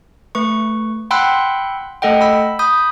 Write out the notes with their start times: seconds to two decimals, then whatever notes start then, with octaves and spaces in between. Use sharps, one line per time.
0.35 A3 B4 C#6
1.11 F#5 G5 B5 C6 E6 F#6
2.02 A3 A4 D#5 F#5 G5
2.21 B5 E6
2.59 B5 D#6 G6